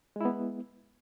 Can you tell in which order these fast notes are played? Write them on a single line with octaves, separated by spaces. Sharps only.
G#3 E4 B3